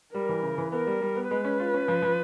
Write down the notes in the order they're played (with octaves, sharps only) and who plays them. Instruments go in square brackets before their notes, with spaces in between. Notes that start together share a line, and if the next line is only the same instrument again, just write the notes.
[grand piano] G3 [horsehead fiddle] A#4
[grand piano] E3
C#3
E3
[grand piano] B3 [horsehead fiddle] A#4
[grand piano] G3
G3
B3
[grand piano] G#3 [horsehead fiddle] B4
[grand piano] C#4
F4
C#4
F3
F3